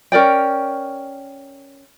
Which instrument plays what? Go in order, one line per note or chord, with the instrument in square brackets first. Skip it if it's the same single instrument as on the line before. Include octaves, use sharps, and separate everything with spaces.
[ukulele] C#4 A#4 D5 G5